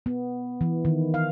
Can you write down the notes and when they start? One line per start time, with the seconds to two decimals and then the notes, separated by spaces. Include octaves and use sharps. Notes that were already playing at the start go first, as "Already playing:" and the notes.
0.06 B3
0.61 E3
0.85 D#3
1.14 F5